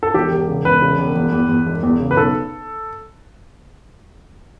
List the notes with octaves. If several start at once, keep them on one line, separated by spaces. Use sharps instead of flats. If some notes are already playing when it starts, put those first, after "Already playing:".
A4
E1 G4
E1
C#3
E1 B4
C#3
E1
E2
E2
E2
E1
E2
C#3
B4
B1 A4